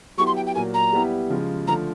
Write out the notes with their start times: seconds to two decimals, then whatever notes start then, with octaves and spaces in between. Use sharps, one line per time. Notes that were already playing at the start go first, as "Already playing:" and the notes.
0.18 F#3 B3 E4 G4 C#6
0.27 C6
0.36 G5
0.47 G5
0.55 A#2 F#3 A#3 G#5
0.74 A#5
0.93 G3 B3 E4 G4
1.30 C#3 F3 G#3
1.67 D3 F3 A3 A#5